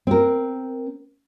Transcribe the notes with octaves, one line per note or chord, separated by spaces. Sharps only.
C4 A#4